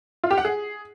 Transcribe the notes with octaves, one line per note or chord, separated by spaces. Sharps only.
F4
G4
F#5
G#4